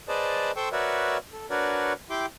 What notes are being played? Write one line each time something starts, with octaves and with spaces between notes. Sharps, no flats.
G#4 B4 C5 D5 D#5 A5
A4 C5 G5 C6 C#6 E6
F#4 A#4 B4 C#5 D5 E5
A4
D4 F#4 A#4 B4 C#5 D5
E4 G4 G5 C6 D6